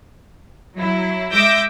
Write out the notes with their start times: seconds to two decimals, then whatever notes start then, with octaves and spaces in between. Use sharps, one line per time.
0.78 F#3 E4
1.32 G#3 E5 D6 E6 G6 A#6